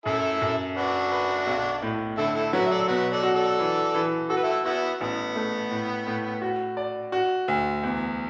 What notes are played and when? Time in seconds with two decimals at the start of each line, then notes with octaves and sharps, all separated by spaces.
0.06 F#2 E4 A4
0.41 F#2
0.76 D4 F#4 B4
1.12 B4
1.47 B1
1.82 A2
2.18 D3 E4 A4
2.35 E4 A4
2.53 F#3 F#4 B4
2.66 E5
2.71 A4 D5
2.88 B2 F#4 B4
3.12 A4 D5
3.23 F#4
3.35 A4 D5
3.59 E3
3.94 E3
4.30 F#4 A4
4.37 B4
4.43 E4 A4
4.65 B3 E4 F#4
5.00 A1 B3
5.36 A3
5.71 A2
6.07 A2
6.42 F#4
6.77 D5
7.12 F#4
7.48 D2
7.83 E2